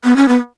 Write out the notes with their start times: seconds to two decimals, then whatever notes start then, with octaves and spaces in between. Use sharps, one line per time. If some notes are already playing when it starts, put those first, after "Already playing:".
0.04 B3
0.16 C#4
0.28 B3